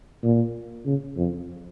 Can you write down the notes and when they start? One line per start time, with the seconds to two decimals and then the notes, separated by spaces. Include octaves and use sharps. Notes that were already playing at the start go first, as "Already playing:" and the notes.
0.23 A#2
0.86 C#3
1.17 F2